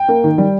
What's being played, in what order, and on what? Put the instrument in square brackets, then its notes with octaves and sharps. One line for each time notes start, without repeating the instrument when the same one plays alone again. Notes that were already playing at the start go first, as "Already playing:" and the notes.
Already playing: [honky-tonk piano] G5
[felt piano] A#3
D#3
G3